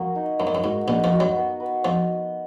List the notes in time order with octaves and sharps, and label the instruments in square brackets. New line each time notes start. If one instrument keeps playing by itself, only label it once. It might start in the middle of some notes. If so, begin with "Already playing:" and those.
Already playing: [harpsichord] F2 [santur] A#3 F#4
[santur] D#4
[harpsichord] F#2 [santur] A#3
[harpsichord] F2
F#2
[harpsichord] G#2 [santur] F#4
[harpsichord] A#1 A#2 [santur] D#5
[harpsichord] F2 F3
[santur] F#4
[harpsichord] F#2 F#3
[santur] B3
B4
[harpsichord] F2 F3 [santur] D#5